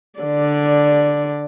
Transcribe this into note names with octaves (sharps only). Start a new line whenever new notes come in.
D3 D5